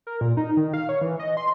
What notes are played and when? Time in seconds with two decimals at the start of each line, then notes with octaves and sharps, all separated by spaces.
0.07 A#4
0.21 A#2
0.37 D#4
0.57 D#3
0.74 F5
0.89 C#5
1.01 E3
1.19 D#5
1.37 C6